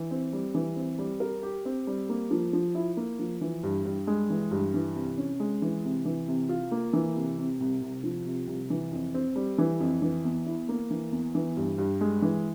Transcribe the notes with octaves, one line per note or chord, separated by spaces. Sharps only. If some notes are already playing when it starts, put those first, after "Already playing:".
Already playing: E3
C4
G3
E3
C4
G3
A#4
G4
C4
G3
A#3
F3
F3
E4
A#3
F3
E3
G2
G2
G#3
E3
G2
E3
C3
C#4
G#3
E3
C3
E3
C3
F4
A#3
E3
C3
C3
C2
C2
F3
C3
C2
E3
F2
C4
G3
E3
F2
E3
E2
E4
A#3
E3
E2
E3
G2
G2
G#3
E3